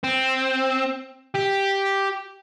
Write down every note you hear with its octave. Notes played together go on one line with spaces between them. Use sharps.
C4
G4